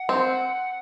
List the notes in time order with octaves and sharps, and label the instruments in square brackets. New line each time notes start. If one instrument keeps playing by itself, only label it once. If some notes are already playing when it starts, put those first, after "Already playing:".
Already playing: [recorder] F#5
[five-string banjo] C4